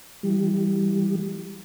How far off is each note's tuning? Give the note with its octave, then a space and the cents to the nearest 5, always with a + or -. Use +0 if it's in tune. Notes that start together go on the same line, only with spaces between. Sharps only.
E3 +0 G3 +0